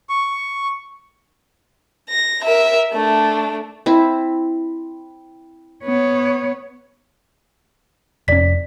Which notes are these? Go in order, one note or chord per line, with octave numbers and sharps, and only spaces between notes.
C#6
A#6
A#4 E5
A3 D4
C4 E4
B3 C#5
F1 C#4 D5 B6